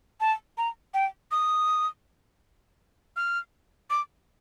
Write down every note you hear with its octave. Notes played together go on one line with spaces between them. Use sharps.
A5
A#5
G5
D#6
F6
D6